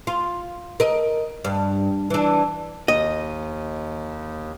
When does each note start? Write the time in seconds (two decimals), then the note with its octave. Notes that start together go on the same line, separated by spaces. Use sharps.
0.07 F4
0.80 A#4 D#5
1.45 G2
2.10 E3 D4
2.88 D#2 D#5